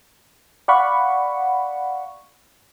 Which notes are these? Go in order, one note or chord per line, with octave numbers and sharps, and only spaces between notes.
D5 F5 F#5 B5 C#6